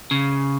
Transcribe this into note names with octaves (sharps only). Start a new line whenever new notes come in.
C#3